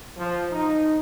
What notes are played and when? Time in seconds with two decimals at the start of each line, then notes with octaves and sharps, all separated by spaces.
0.17 F3
0.51 D#4